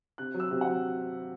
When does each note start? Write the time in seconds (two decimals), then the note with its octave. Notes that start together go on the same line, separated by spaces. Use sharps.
0.18 C3 F#6
0.34 F#3
0.40 E6
0.51 C3
0.61 F#5
0.67 F#3